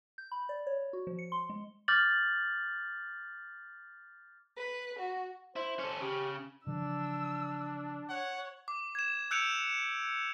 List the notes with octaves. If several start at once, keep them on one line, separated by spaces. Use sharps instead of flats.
G6
B5
D5
C#5
F#4
F3
C#7
C6
G#3
D6 F6 G6 A6 F#7
B4
F#4
E4 C5
C#4 A4
C#3 G4
C#3 E3 F3 D4 E6
C#5 F#5
D6
G#6 E7
E6 F#6 G6 C#7 D7 F7